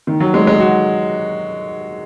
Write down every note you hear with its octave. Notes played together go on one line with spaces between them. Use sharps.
D#3
F#3
G#3
G#3
F#4